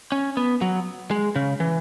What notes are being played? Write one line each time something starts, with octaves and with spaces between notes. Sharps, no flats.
C#4
B3
F#3
G#3
C#3
E3